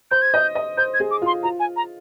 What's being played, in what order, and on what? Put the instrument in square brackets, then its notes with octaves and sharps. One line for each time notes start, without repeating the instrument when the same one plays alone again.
[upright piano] C5 [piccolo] G6
[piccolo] G#6
[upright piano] D#5 [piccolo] G6
[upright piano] D#5
[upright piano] C5 [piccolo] G6
[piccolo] G#6
[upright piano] G#4
[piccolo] D6
[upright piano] F4 [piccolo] C6
[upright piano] F4 [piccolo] A#5
[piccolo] G#5
A#5